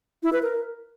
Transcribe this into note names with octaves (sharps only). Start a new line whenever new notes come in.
E4
B4
A#4